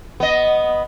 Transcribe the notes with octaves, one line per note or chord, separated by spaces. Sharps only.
B3 D#5